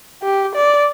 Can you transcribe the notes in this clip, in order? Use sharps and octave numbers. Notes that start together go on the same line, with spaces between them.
G4
D5